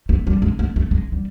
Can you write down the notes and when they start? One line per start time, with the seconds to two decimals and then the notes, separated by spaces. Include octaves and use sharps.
0.09 A3
0.27 G3
0.42 G#3
0.59 A3
0.76 A3
0.91 G#3
1.12 G3